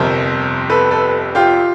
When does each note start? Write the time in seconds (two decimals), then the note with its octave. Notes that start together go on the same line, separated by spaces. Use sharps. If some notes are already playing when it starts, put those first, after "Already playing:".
Already playing: G1 F2 C3 A#4 C5
0.70 A4 B4
0.91 A4 B4
1.35 F4 G4